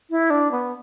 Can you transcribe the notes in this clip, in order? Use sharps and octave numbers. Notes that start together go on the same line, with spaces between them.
E4
D4
B3